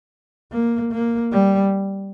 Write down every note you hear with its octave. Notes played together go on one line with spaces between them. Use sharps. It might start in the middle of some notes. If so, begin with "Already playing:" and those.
A#3
A#3
G3